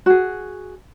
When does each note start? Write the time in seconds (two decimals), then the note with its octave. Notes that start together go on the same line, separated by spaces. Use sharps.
0.06 F#4 G#4